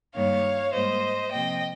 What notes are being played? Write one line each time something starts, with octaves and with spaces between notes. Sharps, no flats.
G2 D#3 G3 A#3 C#5 F5
G#2 G3 A#3 C5 D#5
C3 F3 A#3 D#5 G5